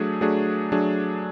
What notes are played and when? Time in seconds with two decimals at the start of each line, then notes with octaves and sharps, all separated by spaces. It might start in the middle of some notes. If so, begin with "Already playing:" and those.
Already playing: F#3 A3 D4 G#4
0.21 F#3 A3 D4 G#4
0.72 F#3 A3 D4 G#4